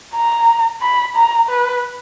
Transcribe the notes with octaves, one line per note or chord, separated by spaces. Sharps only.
A#5
B5
A#5
B4